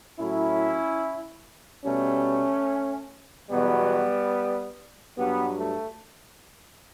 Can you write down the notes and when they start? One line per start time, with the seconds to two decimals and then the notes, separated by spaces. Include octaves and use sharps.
0.18 A2 F#3 C#4 E4
1.84 B2 G3 A3 C#4
3.50 E2 B2 F#3 G3 B3
5.16 G2 F#3 G3 B3
5.58 A3